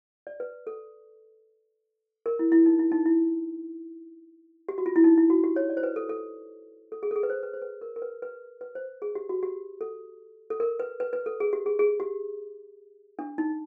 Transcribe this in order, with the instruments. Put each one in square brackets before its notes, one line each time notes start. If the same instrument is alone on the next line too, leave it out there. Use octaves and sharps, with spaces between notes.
[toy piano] D5
B4
A4
A#4
E4
E4
D#4
E4
D#4
E4
G4
F#4
F4
E4
D#4
E4
F#4
G4
C#5
D5
C5
B4
A4
A4
A4
G#4
A4
G#4
B4
C5
B4
C5
B4
A#4
A#4
B4
B4
B4
C5
G#4
G4
F#4
G4
A4
A4
A#4
B4
B4
B4
A4
G#4
G4
G#4
G#4
G4
D4
D#4